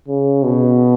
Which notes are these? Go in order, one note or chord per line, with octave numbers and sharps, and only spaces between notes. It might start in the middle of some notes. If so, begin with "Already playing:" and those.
C#3
B2